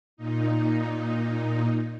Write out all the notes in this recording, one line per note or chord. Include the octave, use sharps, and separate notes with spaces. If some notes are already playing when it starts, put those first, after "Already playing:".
A#2 D#4